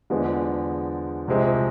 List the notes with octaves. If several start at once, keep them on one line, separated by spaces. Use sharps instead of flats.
E2 D3 F3 G#3 B3
C2 C3 F3 G#3 C4